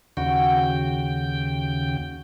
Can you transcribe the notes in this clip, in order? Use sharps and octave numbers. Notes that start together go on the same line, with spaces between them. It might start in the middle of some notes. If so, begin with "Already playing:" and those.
D#2 C#3 F#4 G5